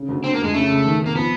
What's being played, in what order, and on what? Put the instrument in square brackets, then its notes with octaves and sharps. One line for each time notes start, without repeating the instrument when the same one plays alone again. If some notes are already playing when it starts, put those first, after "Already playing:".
Already playing: [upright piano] C#3
D2
[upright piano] D3 [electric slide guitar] C4
[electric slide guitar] A#3
[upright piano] F2
[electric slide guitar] G#3
[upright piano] C#3 [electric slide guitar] A3
[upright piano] C#2
D#3
C3
[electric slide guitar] A#3
[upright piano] F3 [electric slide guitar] B3